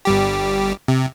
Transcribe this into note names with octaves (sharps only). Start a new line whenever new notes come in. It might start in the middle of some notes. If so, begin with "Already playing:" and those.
G1 G3 G4
C3